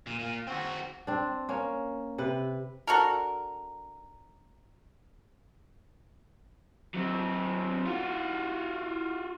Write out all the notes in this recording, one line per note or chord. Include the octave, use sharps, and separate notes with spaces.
A#2
A#2
C4 F#4
C4 D4
A#3 C#4
C3 B4
D4 F#4 A4 A#4
F#3 C4
F4 F#4